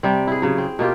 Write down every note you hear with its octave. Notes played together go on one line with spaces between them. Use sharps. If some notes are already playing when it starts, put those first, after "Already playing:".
C3 G3 C4
E4 G#4
C#3 F#3
C4
B2 A#3 F4 G4